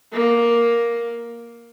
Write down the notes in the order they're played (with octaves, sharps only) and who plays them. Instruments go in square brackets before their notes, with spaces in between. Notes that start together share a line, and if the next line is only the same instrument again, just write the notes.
[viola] A#3